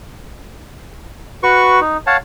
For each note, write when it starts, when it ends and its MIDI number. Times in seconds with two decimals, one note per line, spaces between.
1.43 1.80 66
1.43 1.80 71
1.43 1.80 85
1.81 1.97 63
2.07 2.17 73
2.07 2.17 77
2.07 2.17 78
2.07 2.17 81